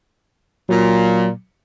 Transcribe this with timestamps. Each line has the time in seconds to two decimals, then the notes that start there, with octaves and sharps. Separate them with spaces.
0.69 A#2 F#3